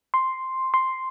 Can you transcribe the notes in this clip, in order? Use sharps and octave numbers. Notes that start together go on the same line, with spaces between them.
C6
C6